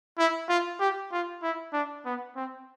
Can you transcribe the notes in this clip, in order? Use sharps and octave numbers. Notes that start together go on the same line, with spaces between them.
E4
F4
G4
F4
E4
D4
B3
C4